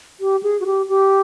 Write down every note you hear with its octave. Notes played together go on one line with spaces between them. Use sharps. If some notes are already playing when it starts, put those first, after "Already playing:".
G4
G#4
F#4
G4
G4